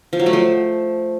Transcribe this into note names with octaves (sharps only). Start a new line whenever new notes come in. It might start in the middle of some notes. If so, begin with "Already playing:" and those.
F3
F#3
A3
F3